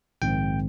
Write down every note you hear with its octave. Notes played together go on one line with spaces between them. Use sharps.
A#1 G#2 D#3 G#3 C4 G5